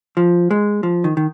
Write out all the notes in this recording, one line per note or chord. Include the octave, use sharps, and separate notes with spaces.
F3
G#3
F3
D#3
D#3